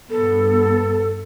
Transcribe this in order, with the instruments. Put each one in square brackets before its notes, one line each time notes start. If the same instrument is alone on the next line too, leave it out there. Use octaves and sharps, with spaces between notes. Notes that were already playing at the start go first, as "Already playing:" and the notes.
[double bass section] G2 B3 [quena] A4